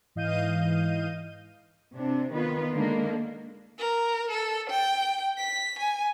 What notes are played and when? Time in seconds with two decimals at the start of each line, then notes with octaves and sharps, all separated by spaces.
0.15 G#2 E3 D#5 F5 G6 D#7
1.94 C3 D4
2.32 D#3 B3 F4 B4
2.73 D3 D#3 G#3 A#3 D4
3.78 A#4
4.31 A4
4.70 G5
5.37 B6
5.79 G#5